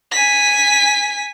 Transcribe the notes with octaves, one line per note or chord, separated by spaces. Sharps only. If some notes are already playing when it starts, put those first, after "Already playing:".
G#5 B6